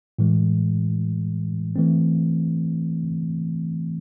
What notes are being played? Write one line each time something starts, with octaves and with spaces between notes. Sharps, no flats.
A2 E3 G#3
E3 A3 C4